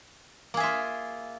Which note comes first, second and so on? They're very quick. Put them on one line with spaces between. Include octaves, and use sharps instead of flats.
A#3 G#4 E5 F4